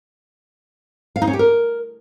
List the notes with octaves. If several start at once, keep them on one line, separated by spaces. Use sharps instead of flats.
F5
D#4
C#4
G4
A#4